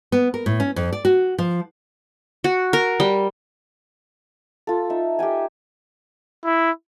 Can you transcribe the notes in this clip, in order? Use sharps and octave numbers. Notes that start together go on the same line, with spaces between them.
B3
A#4
A2
C#4
F2
D5
F#4
F3
F#4
A#4
G3
F4 A4
D#4 E5
G4 A#4 G5 G#5
E4